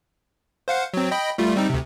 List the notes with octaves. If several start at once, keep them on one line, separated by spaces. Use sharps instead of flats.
C5 F5 F#5
F#3 C4
D#5 G5 B5
G3 A3 F4
G3 C4 D#4
D2 C3